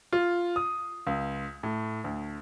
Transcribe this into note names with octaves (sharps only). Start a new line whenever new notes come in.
F4
D#6
C#2
A2
D2